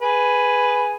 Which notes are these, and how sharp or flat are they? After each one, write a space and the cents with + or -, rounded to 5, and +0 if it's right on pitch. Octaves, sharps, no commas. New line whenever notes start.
G#4 +0 B4 +0